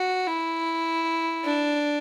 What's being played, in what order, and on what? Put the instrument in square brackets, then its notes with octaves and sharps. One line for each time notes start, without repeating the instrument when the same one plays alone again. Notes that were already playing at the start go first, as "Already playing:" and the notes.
Already playing: [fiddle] F#4
E4
D4